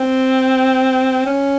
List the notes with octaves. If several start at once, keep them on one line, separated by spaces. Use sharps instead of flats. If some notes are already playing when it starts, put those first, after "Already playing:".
Already playing: C4
C#4